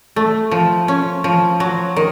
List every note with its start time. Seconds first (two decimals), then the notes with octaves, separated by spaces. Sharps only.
0.16 A3
0.51 F3
0.88 C#4
1.24 F3
1.60 F#3
1.96 D#3